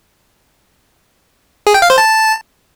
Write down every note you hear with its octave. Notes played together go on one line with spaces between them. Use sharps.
G#4
G5
F5
C5
A5